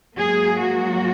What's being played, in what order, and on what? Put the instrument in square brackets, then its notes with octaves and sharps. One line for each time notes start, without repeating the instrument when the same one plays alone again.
[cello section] G#2 F#3 A#3 G#4
F#4